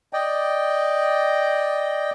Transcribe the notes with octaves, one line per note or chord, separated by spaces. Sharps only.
D5 D#5 G5